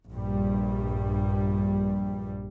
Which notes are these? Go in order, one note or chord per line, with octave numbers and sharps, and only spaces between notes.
A#1 G2 G3